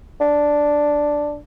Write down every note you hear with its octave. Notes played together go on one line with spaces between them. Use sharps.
D4